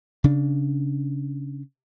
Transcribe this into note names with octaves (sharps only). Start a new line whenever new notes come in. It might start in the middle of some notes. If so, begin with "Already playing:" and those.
C#3 D4